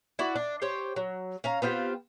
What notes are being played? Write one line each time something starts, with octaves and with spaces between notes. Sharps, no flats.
E4 F#4 D5
D4
G4 C5 C#5
F#3
C#4 F5 A#5
B3 C4 F4 G4